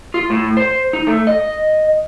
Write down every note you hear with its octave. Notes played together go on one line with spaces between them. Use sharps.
F4
A2
C5
D#4
A3
D#5